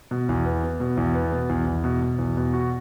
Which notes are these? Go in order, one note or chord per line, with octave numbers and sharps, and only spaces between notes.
B2
E2
B3
B3
B2
E2
B3
B2
E2
E2
B2
B2
E2
B2
F#4